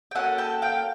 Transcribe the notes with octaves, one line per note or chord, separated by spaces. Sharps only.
G5
A#3 C#4 F#4 A4 F#5 G#5
G5 A5
F5 G5